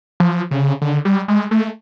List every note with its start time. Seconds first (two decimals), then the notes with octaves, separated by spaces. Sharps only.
0.20 F3
0.51 C#3
0.82 D3
1.05 G3
1.28 G#3
1.51 A3